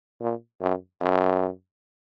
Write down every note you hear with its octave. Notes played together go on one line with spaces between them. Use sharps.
A#2
F#2
F#2